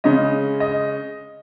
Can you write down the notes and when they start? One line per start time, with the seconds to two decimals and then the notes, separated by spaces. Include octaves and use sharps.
0.04 C#3 G#3 C#4 D#5
0.60 D#5